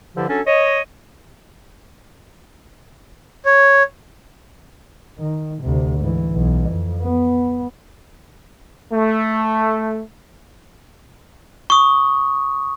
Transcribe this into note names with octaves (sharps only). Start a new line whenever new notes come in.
G2 D3 F3 E4 G4
F#3 C#4 D4 A4
C#5 D#5
C#5
D#3
D2 C3
G#2 E3
B1 E3
F2
B3
A3
C#6 D#6